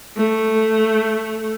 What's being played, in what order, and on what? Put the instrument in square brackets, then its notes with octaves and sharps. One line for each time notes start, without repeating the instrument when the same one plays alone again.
[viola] A3